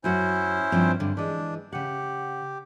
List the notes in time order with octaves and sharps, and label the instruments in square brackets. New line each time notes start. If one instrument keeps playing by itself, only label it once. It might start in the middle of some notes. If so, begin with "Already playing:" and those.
[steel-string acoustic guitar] F#2 F#4 F#5 [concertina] C#4 E4 C5
[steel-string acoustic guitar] G2 F3 C4
G2 D3
[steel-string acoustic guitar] E3 G#3 [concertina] D4
[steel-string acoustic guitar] C#3 F#5 [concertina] G4